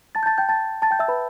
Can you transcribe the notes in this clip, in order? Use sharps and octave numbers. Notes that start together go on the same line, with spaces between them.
A5 A6
G6
A5 A6
G5 G6
A5 A6
A5 A6
G5 G6
E5 E6
B4 B5